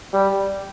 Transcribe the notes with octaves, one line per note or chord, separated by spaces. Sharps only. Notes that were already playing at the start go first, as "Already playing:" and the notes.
G3